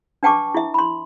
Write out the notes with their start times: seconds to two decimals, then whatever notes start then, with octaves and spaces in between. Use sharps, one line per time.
0.23 D4 B4 G5 A5 C#6 D6
0.54 E4 E5
0.74 B5 C6